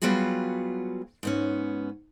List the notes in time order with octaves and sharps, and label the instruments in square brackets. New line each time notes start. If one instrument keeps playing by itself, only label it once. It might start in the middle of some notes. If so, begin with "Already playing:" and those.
[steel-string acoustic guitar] F#3 G3 B3 F4 F#4 G#4
G#2 B3 C#4